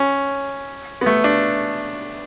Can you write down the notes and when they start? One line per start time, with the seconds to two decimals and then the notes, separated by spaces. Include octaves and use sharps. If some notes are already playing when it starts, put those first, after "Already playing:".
Already playing: C#4
1.01 B3
1.06 A3
1.24 D4